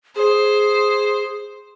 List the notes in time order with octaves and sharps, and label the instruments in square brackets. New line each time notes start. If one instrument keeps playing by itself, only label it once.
[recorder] G#4 [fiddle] C5